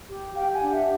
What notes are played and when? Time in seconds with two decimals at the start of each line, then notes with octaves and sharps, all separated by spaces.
0.09 G4
0.36 G4 F5 G5
0.54 F#5 G#5
0.62 D4
0.71 E5 F#5